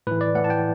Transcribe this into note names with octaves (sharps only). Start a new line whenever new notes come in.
A2 E3 B4
D5
A2 E3 F#5
A5
G5